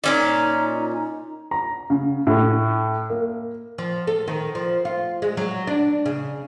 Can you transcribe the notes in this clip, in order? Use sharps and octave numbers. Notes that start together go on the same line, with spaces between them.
A#2 C#4 D#4 D5
A#5
C#3
A2
A#3
F3
A4
D#3
F3
F4
G#3
F#3
D4
C#3